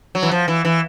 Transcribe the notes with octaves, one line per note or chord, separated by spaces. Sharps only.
F#3
E3
F3
E3
E3